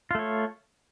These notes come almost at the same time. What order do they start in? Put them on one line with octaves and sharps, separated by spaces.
F4 A3 C#5